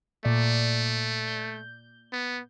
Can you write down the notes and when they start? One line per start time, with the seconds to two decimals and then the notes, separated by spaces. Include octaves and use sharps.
0.25 A#2 A3 D5
1.27 G6
2.12 B3